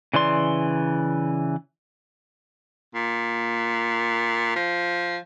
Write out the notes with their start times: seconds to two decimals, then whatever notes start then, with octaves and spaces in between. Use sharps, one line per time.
0.14 C#3 E3 D5 C6
2.95 A#2
4.56 F3